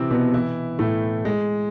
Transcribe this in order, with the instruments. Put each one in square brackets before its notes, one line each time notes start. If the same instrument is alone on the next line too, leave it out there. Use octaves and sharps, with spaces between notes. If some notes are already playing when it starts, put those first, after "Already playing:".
Already playing: [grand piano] C3 E3 C4 E4
B2 B3
E3 E4
A2 A3
G#3